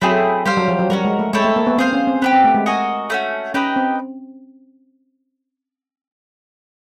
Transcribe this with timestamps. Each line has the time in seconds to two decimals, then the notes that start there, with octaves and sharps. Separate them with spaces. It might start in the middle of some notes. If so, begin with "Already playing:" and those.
0.02 F#3 A3 C4 E4 G#4
0.46 G3 G4 C5 F5
0.57 F#3
0.68 F3
0.79 F#3
0.90 G3 C#4 F#4 A#4
1.05 G#3
1.19 A3
1.33 G#3 C4 E4 A4 C#5
1.45 A3
1.56 A#3
1.67 B3
1.78 C4 G#4 C5 F5
1.93 C#4
2.07 C4
2.22 B3 C4 D4 G4
2.33 C4
2.44 A3
2.54 G#3
2.66 F#4 A#4 D#5 G#5
3.10 A3 C#4 F#4
3.54 C#4 D#4 G4 B4 D#5
3.76 C4